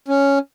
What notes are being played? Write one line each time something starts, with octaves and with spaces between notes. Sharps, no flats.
C#4